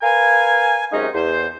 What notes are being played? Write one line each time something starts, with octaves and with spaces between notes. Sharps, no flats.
A#4 B4 F5 G#5
F#2 C3 G#3 C#4 D#4
E2 C5